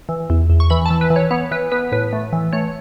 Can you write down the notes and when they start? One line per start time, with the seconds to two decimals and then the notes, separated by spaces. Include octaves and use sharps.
0.09 E3
0.30 E2
0.50 E2
0.60 C#6
0.70 E3 B5
0.86 E3 A5
1.01 B4
1.10 E3
1.16 C#5
1.31 B3 C#5
1.51 E3 B4
1.72 B3 B4
1.92 A2 B4
2.13 A3
2.33 E3
2.53 A3 C#5